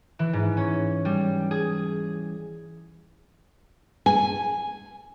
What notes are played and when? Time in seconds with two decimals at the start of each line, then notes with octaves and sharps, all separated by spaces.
0.19 E3
0.33 G#2
0.57 C#4
1.05 G3
1.51 G#4
4.06 G#5